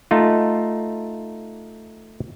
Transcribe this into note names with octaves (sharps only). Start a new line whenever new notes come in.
A3 D#4 F4